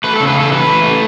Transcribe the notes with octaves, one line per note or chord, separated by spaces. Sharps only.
A3 B4
C#3 A4
B4
A3 A4
E3 B4
A3
A3